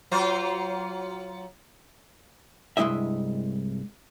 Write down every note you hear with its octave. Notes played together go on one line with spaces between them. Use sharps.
F#3 F4 C5
C2 G2 G#3 E4 D#5 E5